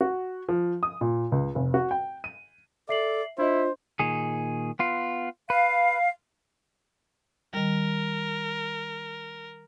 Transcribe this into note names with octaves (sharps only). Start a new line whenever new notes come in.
F#4
F3
D#6
A#2
C#2
F1
F#4
G5
D#7
A4 D5 E5 C7 F#7
D4 E4 F4 C5 D#5
A#2 D#3 G#4
B3 F4
B4 F5
D#3 G3 A#4